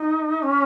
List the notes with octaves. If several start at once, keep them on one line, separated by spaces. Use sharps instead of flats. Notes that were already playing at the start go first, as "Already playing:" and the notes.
Already playing: D#4
C#4